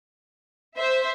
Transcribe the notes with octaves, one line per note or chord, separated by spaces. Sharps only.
C5 E5